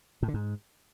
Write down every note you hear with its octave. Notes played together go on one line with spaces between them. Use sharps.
A2
D3
G#2